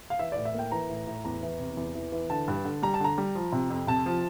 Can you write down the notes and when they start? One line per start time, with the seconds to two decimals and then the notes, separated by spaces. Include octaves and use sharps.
0.10 F5
0.19 E3 E5
0.32 A2 D5
0.45 E5
0.54 A#3 G5
0.72 E3 A#5
0.89 A2
1.07 A2
1.25 E2 A#5
1.43 E3
1.59 C3
1.77 E2
1.95 E3
2.12 E3
2.30 D3 A5
2.48 G2
2.65 D3
2.83 G3 A#5
2.94 A5
3.00 D3 A#5
3.18 G3
3.35 F3
3.52 C3
3.70 F2
3.87 C3 A5
4.06 F3